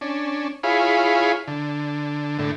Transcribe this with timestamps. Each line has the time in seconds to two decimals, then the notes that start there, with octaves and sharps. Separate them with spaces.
0.01 C#4 D4
0.63 E4 F4 G#4 C#5 F5 B5
1.48 D3
2.39 A2 D3